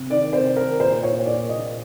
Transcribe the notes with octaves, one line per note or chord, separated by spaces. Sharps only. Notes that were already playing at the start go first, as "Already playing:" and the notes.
Already playing: C3
D#3 D5
C3 C5
D#3 A#4
A#2 C5
A#2 C#5
A#2 D5
A#2 D#5